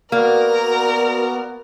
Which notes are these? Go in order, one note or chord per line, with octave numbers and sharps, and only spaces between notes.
A#3 B3 F#4 A#4 D5